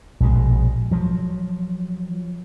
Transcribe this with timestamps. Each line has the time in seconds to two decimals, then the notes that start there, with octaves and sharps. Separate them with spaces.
0.20 A#1 B2 G#3
0.91 F3 F#3